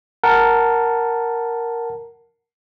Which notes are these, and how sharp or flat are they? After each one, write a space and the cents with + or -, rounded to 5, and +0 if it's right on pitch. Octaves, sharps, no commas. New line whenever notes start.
A#4 +0 F#5 +0 A5 +0